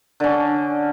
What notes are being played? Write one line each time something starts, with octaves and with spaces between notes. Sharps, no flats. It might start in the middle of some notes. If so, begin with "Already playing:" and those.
D3 C#4